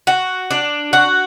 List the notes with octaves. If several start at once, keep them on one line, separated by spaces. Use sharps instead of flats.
F#4
D4
F#4